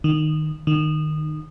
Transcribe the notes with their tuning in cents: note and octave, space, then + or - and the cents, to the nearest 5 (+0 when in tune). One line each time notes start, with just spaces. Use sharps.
D#3 -15
D#3 -25